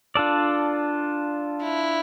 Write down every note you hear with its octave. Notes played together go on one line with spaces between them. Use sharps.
D4 F4 A4 D5
E4